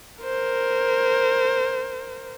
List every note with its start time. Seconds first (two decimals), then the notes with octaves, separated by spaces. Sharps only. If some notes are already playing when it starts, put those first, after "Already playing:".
0.22 A#4 C5